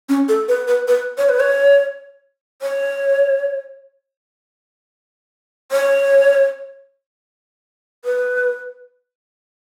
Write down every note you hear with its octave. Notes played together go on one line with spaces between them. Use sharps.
C#4
A4
B4
B4
B4
C#5
B4
C#5
C#5
C#5
B4